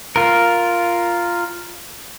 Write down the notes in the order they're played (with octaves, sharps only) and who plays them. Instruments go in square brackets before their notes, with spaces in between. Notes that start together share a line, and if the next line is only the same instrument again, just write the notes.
[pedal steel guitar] F4 A#4